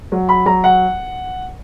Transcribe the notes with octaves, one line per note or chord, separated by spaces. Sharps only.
F#3
B5
F#3 A#5
F#5